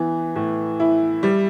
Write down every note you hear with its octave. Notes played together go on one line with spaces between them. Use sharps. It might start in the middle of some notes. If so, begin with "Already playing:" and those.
Already playing: E3 B3
A2
E4
G3